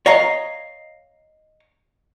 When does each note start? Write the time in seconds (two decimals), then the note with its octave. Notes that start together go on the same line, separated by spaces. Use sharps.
0.06 C#5 D#5 F5 A#5